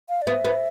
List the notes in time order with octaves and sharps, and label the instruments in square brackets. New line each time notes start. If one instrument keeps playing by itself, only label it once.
[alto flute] F5
D5
[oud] B3 [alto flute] E5
[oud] B3